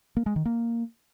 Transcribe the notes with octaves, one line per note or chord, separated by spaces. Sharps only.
A#3
G#3
D#3
A#3